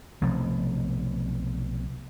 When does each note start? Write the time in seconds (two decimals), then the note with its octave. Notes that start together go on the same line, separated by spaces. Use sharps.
0.22 B1 C3 F3 A3